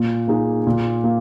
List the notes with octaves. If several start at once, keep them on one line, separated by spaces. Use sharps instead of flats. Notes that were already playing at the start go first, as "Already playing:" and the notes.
Already playing: A#2
A#3 D#4 G#4
A#2
A#3